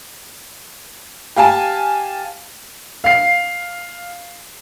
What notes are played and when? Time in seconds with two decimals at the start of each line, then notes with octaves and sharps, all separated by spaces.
1.36 G4 F5 G#5 A5
3.04 F5 C7